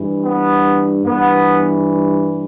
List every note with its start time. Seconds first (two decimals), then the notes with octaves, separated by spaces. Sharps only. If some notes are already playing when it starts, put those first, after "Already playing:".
Already playing: G2 E3
0.25 B3
1.06 G2 E3 B3